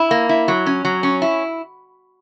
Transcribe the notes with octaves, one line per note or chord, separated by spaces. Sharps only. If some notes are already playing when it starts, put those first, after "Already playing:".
Already playing: E4
A#3
E4
F#3
C#4
F#3
C#4
E4